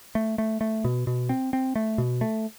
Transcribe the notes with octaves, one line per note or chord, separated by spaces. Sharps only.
A3
A3
A3
B2
B2
C4
C4
A3
B2
A3